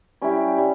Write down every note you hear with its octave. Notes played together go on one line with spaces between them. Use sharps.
G3 C#4 E4 G4
G3 C#4